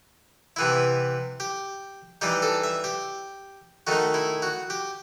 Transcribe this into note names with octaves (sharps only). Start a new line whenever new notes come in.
C3 E3 B3 E4
G4
E3 G3 D#4 G4
A4
E5
G4
D#3 A3 D#4 F#4
E4
F#4
G4